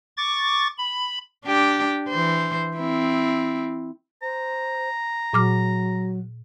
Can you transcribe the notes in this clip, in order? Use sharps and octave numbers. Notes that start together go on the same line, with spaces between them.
C#6 D6 A6
B5
D4 G4
E3 C5
C4 E4
C5 A#5
A#2 F#3 D6 F6